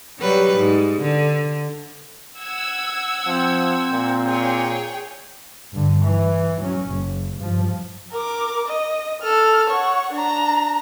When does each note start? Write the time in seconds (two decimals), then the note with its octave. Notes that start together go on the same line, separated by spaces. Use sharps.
0.20 F#3 G3 B4
0.57 G#2
1.03 D3
2.39 F#5 E6 G#6
3.26 F3 C4
3.92 A#2
4.24 G#4 C#5 G5
5.73 G2 D3
6.04 E3
6.61 F#3 C#4
6.90 F#1
7.38 G2 F3
8.12 A#4 D6
8.68 D#5
9.22 A4 F6
9.70 C#5 F#5
10.13 D4 A#5